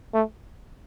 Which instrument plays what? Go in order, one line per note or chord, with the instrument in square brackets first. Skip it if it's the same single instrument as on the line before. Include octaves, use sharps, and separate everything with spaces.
[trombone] A3